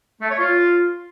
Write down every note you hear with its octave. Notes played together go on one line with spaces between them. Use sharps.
A3
C#5
F4